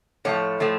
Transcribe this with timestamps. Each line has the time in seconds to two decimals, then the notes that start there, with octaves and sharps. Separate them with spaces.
0.25 A2 F3 A3 C#5
0.60 A2 F3 A3